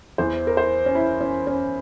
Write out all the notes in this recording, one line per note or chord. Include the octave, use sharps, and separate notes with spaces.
E2 E3 C5
A#4
C5
C#4
E4
C#4
C#4